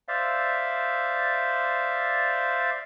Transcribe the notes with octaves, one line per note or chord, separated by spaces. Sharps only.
C5 D5 E5 F5